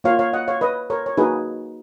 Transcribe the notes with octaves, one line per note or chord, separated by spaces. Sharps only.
A#3 F4 C#5 F5
C#5 F5
D#5 F#5
C#5 F5
B4 D#5
A#4 C#5
C#5
A#3 D#4 F#4 G#4 B4